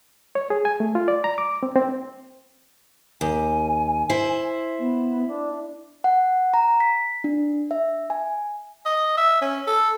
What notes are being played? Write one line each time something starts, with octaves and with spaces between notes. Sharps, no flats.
C#5
G#4
G#5
A3
F4
D5
A#5
D6
C4
C4
D#2 G#5
E4 C5
B3
D4
F#5
A#5
B6
D4
E5
G#5
D#5
E5
C#4
A4